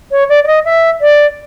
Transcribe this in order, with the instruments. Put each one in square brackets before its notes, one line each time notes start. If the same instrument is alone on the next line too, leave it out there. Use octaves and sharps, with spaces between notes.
[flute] C#5
D5
D5
D#5
E5
D5